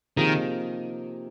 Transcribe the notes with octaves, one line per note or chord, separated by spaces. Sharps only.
C3 D#3 F3 A#3 D#4 G#4